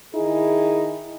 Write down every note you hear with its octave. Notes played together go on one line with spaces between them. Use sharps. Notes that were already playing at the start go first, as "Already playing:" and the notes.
D#3 D#4 E4 G#4